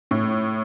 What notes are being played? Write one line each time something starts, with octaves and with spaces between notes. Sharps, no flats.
A2